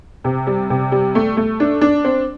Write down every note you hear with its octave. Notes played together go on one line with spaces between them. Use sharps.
C3
G3
C3
G3
A3
A3
D4
D4
C4